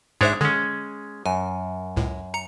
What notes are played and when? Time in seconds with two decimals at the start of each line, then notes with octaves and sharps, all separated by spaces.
0.21 G#2 G#3 D4 C5 C#5 E5
0.41 D3 G#3 C#4
1.26 F#2 G#5
1.96 C#2 A2
2.34 A#5 C#7